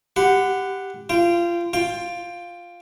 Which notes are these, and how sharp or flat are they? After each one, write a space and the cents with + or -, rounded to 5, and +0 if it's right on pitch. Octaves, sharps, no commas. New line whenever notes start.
G4 +0 F#5 +0 B5 +40
F4 -25 G5 +0
F4 +0 G5 +15